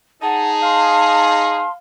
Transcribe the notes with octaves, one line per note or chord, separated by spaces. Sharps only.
D#4 G#4 F#5 A5
F5 C6